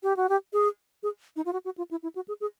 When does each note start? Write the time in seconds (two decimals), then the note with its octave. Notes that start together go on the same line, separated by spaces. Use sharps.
0.03 G4
0.17 F#4
0.29 G4
0.53 G#4
1.03 G#4
1.36 D#4
1.45 F4
1.53 F#4
1.65 F#4
1.78 F4
1.91 E4
2.03 E4
2.15 F#4
2.28 G#4
2.41 G#4